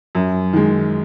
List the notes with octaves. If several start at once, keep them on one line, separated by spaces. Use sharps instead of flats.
F#2
D#3 G#3